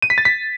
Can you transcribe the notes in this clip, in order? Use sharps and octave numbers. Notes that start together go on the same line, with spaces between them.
D#7
B6
A6
B6